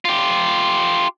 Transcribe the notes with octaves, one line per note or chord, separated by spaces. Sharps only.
F4 G4